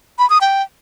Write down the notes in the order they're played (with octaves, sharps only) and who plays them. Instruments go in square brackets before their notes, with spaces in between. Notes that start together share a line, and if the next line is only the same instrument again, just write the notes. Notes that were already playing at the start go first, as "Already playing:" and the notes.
[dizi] B5
D#6
G5